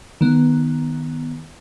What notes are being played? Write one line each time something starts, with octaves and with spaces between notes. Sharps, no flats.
D#3 B3